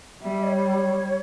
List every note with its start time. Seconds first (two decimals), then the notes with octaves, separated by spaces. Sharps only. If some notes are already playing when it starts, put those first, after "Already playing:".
0.22 G3 E5
0.44 C#5